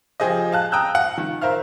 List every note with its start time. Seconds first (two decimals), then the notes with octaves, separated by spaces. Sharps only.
0.20 F3 G4 G#4 C5 D#5
0.52 F5 A5 F#6
0.72 G5 A#5 D#6 E6 F#6 G6
0.95 F5 F#5
1.18 D#3
1.41 A#4 C5 E5 F5 F6